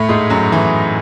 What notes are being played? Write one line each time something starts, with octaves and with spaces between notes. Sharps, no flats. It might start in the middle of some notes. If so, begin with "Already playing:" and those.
Already playing: A2 A3
G#2 G#3
F#2 F#3
E3